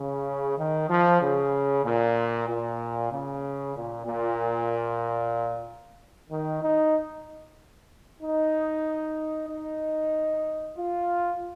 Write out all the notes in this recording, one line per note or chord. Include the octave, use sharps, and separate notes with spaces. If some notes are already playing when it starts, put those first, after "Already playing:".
Already playing: C#3
D#3
F3
C#3
A#2
A#2
C#3
A#2
A#2
D#3
D#4
D#4
D#4
F4